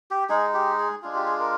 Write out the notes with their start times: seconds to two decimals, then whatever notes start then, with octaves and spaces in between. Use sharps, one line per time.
0.11 G4
0.29 G#3 D#4 G#4
0.54 G4
0.78 G#4
1.02 G#3 D4 F4 G#4
1.15 G4
1.26 G#4
1.40 A#4